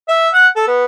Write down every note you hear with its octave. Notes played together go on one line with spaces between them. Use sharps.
E5
F#5
A4
B3